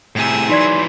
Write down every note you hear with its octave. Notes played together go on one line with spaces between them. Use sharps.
A2 C3 G#4 E6
E3 F#3 D#4 D5 C6 G#6